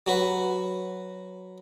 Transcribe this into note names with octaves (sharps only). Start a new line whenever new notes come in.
F#3 F#4 B4